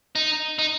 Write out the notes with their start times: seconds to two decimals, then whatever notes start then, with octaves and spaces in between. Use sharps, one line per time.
0.15 D#4
0.59 D#4